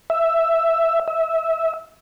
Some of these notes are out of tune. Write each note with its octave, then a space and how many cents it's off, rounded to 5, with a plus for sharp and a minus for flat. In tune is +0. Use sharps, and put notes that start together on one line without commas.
E5 +5
E5 -20